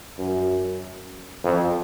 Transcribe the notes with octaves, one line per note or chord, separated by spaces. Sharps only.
F#2
F2